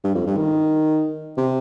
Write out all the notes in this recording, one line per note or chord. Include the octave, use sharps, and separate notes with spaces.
G2
F2
G2
D#3
C3